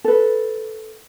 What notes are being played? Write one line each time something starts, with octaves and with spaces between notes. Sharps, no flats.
A4 B4